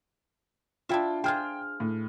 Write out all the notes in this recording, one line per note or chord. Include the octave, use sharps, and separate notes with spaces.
D4 E4 F4 E5 G5
F4 G#4 C5 G5 F6
A2